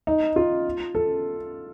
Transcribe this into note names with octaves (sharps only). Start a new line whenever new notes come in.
D#4
F4
A4